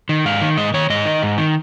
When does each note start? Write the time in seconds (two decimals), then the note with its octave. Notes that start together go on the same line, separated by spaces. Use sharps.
0.09 D#3
0.25 G#2 F5
0.41 D#3
0.57 G#2 D#5
0.74 D#3 C#5
0.90 G#2 D#5
1.06 D#3
1.23 G#2
1.38 D#3